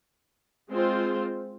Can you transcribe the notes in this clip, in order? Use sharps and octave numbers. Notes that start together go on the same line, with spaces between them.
G#3 C4 F4 C5